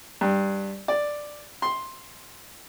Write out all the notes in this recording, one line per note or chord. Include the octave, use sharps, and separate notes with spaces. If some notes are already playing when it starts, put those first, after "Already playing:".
G2
D5
C6